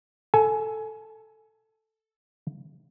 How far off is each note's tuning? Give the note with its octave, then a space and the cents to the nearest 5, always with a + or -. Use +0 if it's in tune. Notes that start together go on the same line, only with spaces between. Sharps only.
A4 +0 G#5 +25